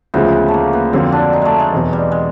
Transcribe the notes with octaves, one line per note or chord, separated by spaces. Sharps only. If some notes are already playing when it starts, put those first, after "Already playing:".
D2 C#3 F3 G#3 B3
A3
A#3
B3
F2 D3 F#3 A#3 C4
D4
D#4
G#3 A3
G#3
E2 B2 F#3
G3
G#3